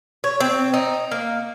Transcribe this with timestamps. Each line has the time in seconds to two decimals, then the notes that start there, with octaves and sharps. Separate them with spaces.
0.24 C#5
0.40 C4
0.74 D#4
1.11 A#3